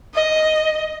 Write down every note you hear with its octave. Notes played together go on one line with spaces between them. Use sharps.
D#5